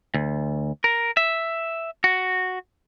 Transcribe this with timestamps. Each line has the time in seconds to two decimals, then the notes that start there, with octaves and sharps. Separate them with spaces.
0.14 D2
0.84 A#4
1.17 E5
2.04 F#4